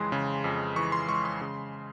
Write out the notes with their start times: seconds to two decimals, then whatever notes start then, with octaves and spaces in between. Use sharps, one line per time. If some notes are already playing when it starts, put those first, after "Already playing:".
Already playing: F2 C#3 E3 G#3 C6
0.12 C#3
0.44 F2
0.76 E3 C#6
0.92 C6
1.08 G#3 C#6
1.25 C6
1.41 C#3